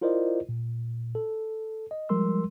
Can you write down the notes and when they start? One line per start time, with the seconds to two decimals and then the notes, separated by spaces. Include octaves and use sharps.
0.01 E4 F4 A#4 C5 D5 D#5
0.49 A#2
1.15 A4
1.91 D#5
2.09 F3 G3 G#3 A#4 C6 E6